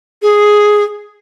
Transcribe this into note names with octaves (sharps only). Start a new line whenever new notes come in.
G#4